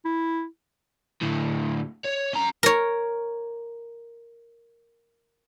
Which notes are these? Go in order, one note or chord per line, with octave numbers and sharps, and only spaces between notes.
E4
D2 A2
C#5
C#4 A#5
A#4 C#5